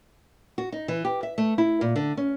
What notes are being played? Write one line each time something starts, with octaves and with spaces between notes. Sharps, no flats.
F#4
D#4
E3
G4
E5
A3
E4
A#2
D3
C#4